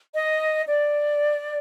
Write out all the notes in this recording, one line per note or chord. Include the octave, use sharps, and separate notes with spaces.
D#5
D5